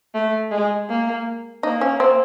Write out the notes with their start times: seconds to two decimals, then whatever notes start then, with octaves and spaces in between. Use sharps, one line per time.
0.14 A3
0.51 G#3
0.89 A#3
1.63 A#3 D#4
1.81 C#4
2.00 C4